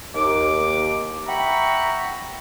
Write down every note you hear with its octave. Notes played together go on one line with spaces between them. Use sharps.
D#2 D6
E5 F#5 G5 A#5 B5 C#6